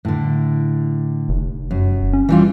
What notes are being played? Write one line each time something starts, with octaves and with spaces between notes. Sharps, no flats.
A2 D3
F1
F#2
C#4
E3 G3 F4